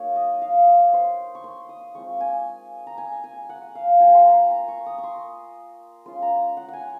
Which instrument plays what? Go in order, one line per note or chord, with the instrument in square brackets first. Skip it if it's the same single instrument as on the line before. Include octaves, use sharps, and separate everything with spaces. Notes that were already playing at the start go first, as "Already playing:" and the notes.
Already playing: [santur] F#3 A#3 D#4 C#5
D#5
F5
C#5
C5
C#6
C6
D#6
G#3 C4 F4 C#6
G#5
A#5
G#5
G#5
F#5
F5
A#3 F4 G#5
C6
A#5
A#5
C#6
D#6
C#6
C6
G#3 C#4 F4 C6
A#5
F#5
F#5 G#5